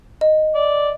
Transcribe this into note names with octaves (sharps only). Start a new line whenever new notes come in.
D#5
D5